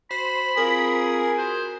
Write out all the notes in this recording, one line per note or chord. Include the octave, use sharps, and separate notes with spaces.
F#4 C5 B5
C4 F4 G#4 A#4 F5
F#4 A#4 C5